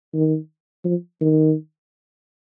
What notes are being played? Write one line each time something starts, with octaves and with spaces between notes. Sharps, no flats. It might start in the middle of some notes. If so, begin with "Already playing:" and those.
D#3
F3
D#3